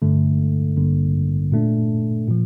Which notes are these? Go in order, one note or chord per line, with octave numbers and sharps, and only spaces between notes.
G1 G2 D3 A3
A1 G2 D3 G3 A#3
A#2 A3 D4
A#2 F3